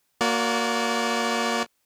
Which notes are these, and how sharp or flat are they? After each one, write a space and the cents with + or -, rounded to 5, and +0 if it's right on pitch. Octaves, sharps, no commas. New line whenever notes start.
A#3 +0 F#4 -15 D5 -35